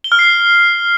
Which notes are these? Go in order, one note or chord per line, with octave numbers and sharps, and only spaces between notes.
G7
F6
C7